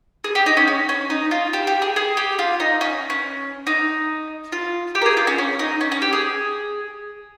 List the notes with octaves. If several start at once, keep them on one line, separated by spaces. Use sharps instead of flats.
G#4
G4
D#4
C#4
C#4
C#4
D#4
F4
G4
G4
G#4
G#4
G4
F4
D#4
C#4
C#4
D#4
F4
G4
A#4
G#4
F4
C#4
C#4
D#4
C#4
C#4
G4
G#4